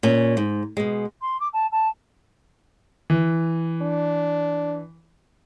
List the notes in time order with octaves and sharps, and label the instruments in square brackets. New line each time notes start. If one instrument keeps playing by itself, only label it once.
[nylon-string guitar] A#2 C#4
G#2
B2 G#3
[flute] C6
D6
A5
A5
[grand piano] E3
[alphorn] D4